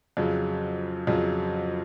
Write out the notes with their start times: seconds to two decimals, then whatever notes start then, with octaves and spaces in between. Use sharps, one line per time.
0.17 F2 C#3 F#3
1.07 F2 C#3 F#3